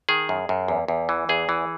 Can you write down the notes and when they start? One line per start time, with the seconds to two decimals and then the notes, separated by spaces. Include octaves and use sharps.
0.09 D#3 G#4
0.29 F#2
0.49 F#2
0.68 E2
0.88 E2
1.09 E3
1.29 E2 G#4
1.49 E3